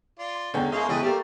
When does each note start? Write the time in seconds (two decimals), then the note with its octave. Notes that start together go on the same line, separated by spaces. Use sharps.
0.19 F4 D5 C6
0.54 E2 D3 G#3 C#4 G5
0.72 A3 A#3 G#4 D#5 F5 C6
0.89 C#2 E3 G#4 A4 B4 D#5 G5
1.03 G3 A3 A#3 G4